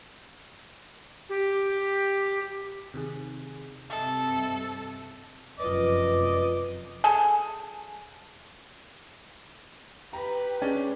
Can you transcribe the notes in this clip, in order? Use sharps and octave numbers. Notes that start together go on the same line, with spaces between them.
G4
C3 D#3 G#4
G2 C3 A4 D#5 E5
F1 F#2 C3 F4 B4 D5 D#5
G#4 A4
G4 B4 A#5 B5
G#3 C#4 D4